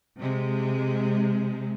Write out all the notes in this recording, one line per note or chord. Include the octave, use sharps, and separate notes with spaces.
C3 G#3